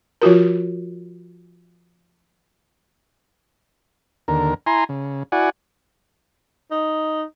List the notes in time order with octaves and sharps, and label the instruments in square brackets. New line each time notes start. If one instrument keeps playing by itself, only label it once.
[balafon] F3 F4 F#4 A#4
[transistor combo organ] D#2 D3 A#4
E4 G#5 A#5 C6
C#3
E4 F#4 D5 F#5 G#5
[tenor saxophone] D#4